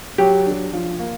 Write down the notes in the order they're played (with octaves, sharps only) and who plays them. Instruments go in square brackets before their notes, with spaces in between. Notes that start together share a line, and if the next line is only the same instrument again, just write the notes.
[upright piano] F#3 [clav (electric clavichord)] G4
[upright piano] D4
F3
A#3